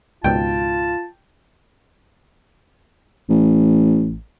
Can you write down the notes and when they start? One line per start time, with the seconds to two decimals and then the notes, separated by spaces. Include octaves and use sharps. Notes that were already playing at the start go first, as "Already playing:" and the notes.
0.24 C#2 G#2 B2 F4 G5 A5
3.30 A1